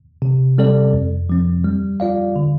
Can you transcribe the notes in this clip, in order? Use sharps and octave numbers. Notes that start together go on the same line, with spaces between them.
C3
G3 C4 A4 D5
F2
F3 C4
G3
F4 D5 F5
D3